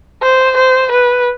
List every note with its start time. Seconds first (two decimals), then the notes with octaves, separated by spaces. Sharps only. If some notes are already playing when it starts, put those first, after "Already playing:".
0.23 C5
0.57 C5
0.92 B4